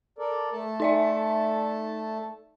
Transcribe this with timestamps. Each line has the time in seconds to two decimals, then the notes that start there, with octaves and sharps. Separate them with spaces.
0.19 A4 A#4 D5
0.52 A3 A4 A5
0.80 D#4 D5 E5